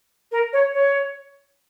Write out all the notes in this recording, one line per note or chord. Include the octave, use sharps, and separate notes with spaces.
A#4
C#5
C#5